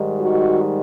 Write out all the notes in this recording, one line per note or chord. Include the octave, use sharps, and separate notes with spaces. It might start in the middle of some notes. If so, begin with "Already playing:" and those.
Already playing: G#2 D#3 G3
F#4